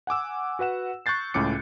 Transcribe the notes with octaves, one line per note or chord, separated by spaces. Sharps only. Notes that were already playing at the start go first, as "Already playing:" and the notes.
F#5 G#5 D6 E6
F#4 B4 F#5 E7
C#6 F#6 G6 A6 C7
C#2 A2 C#4 D6 C#7